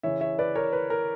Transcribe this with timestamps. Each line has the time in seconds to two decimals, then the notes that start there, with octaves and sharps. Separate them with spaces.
0.03 C#3 E3 C#5 E5
0.21 C#5 E5
0.39 B4 D5
0.55 A#4 C#5
0.73 B4
0.90 A#4